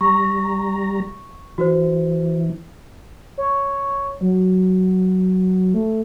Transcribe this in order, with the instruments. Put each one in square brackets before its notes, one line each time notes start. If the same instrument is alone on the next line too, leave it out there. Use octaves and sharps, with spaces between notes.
[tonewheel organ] G3 A#5 [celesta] C#6
[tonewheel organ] E3 [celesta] F#4 B4 C5
[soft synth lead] C#5
F#3
A3